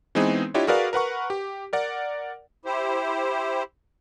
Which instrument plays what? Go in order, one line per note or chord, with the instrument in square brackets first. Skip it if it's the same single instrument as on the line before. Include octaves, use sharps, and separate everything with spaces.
[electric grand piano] E3 G#3 B3 C4 D#4 G#4
D4 E4 F4 G4 C#5 D#5
F#4 G#4 A#4 B4 D5 F5
A#4 B4 F#5 C#6
G4
A#4 D5 F#5
[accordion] E4 G4 C5